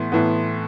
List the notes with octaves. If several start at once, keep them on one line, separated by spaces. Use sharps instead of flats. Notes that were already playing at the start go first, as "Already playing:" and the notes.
Already playing: A2 E3 B3 C6
A2 E3 B3